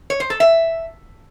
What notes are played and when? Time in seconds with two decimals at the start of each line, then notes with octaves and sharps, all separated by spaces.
0.10 C#5
0.20 C5
0.30 A4
0.40 E5